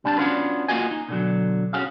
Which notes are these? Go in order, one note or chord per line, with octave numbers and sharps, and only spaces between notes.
C2 G3 D4 G#5 A5
B3 C#4 D4 F4 F#4 B4
A#3 F4 F#4 G#4 D#5 G#5
D#4
B2 D3 F#3
C#4 F#4 G#4 F5